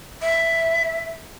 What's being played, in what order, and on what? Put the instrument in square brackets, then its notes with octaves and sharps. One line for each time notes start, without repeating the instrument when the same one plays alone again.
[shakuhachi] E5